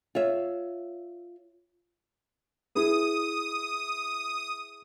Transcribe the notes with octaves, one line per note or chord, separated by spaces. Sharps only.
F4 C#5 E5
E4 G#4 B4 D#6